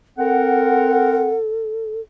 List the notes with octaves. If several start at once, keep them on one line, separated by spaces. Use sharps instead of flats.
C4 A4 A#4 F#5